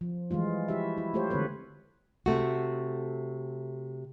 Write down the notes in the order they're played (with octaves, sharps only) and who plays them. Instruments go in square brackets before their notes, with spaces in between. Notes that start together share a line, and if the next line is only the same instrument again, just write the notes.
[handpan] F3
E3 G3 G#3 F4
E4 F#4 G4 E5
E4
A3 F4 G4 A4 C5 C#5
D3 E3 G#3 C4 B4 C#5
[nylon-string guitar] C3 A3 F#4